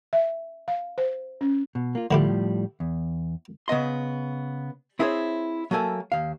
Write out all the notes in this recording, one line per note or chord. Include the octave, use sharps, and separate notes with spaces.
E5
F5
C5
C#4
B2
A#3 F4
A2 D3 F3 G3 E4 G4
E2
C#3 B3 D#5 C6
C4 E4 G#4 A4 C5 C#5
F#3 A3 A#3 A4 G#5
D#2 F5